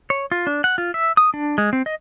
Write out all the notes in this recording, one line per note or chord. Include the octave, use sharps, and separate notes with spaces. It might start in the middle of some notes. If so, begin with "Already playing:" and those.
C#5
F4
D4
F#5
F4
E5
D#6
D4
G#3
C4
D#5